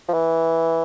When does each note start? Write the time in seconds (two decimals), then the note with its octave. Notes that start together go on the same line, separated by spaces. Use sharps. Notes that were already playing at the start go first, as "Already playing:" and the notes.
0.08 F3
0.13 E3